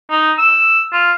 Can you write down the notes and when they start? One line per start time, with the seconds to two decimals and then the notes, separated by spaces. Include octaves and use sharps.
0.11 D#4
0.39 E6
0.93 F4